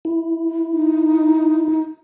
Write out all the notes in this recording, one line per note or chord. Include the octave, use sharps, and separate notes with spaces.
E4
D#4